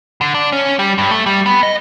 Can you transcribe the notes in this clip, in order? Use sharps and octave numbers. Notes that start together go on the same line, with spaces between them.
D3
D4
C#4
G3
G2
A3
G3
B3
D#5